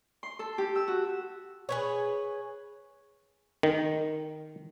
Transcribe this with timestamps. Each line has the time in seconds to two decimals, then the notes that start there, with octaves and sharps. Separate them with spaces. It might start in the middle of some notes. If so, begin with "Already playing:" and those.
0.23 C6
0.39 A4
0.58 G4
0.75 E6
0.88 F#4
1.69 G#4 B4 C#5
3.63 D#3